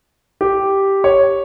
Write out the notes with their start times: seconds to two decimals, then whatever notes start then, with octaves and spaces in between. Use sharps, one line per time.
0.41 G4
1.04 C#5